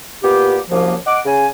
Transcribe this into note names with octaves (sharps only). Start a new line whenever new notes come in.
A#2 B3 G4
C2 F#2 F3 A#3
D#5 F#5 D6
C#3 G#5